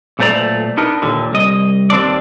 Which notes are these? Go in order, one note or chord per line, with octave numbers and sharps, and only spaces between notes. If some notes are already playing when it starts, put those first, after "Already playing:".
B1 A#2 A3 C5 D5 A#5
B3 D4 D#4 A#4
D#2 A#2 D3
C2 D#5
D#2 C4 D4 D5